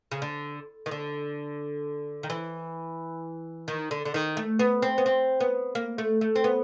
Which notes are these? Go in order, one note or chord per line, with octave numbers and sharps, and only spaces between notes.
C#3
D3
D#3
D3
D#3
E3
D#3
D3
D3
D#3
A3
B3
C4
B3
C4
B3
A#3
A3
A3
C4
B3